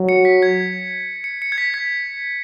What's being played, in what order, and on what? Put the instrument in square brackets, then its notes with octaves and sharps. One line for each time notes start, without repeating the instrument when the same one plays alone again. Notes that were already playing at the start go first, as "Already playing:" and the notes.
Already playing: [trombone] F#3
[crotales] C#7
B6
G#6
C#7
C#7
G#6
B6
G#6